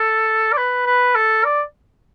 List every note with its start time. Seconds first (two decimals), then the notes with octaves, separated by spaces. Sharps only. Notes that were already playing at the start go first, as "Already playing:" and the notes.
Already playing: A4
0.52 D5
0.57 B4
0.86 B4
1.15 A4
1.44 D5